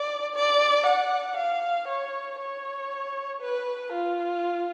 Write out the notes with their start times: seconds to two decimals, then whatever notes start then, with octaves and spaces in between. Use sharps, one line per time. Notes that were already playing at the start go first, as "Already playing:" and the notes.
Already playing: D5
0.35 D5
0.86 F#5
1.37 F5
1.88 C#5
2.39 C#5
3.41 B4
3.92 F4